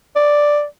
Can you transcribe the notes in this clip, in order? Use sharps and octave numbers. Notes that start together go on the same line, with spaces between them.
D5